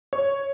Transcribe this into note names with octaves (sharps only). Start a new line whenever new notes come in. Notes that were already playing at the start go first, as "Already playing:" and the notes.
C#5